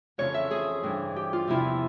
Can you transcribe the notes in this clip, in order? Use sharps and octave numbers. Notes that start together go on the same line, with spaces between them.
F2 C#3 E3 C#5
E5
G#4
G2 E3
G4
F4
E2 C3 F3 E4